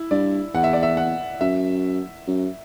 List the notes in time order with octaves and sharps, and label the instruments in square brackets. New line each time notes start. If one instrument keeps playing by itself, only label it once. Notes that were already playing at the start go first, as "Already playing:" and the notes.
Already playing: [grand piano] E4
[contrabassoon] G2 [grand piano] D5
[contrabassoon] E2 [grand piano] F#5
[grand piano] E5
D5
E5
F#5
[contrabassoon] F#2 [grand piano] E5
[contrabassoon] F#2